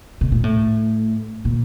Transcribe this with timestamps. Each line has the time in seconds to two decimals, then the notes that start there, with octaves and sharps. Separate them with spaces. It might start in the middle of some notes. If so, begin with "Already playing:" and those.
0.21 B2
0.32 A#2
0.44 A2
1.45 A#2